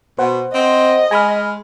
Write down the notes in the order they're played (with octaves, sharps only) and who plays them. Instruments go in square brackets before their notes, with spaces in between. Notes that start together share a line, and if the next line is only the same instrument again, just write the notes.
[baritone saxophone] B2 [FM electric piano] C5 F#5
[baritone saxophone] C4 [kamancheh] D#5
[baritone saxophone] G#3 [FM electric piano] G#5 B5 F6